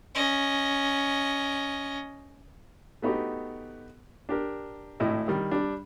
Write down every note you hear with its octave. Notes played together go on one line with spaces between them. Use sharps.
C#4 D#5
A3 B3 D#4 F#4 G4
D4 G4 A#4
G#1 A2 E4 D#5
D#3 G3
G3 D4